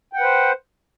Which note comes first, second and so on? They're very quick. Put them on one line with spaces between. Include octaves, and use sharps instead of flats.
G5 F#5 B4 C5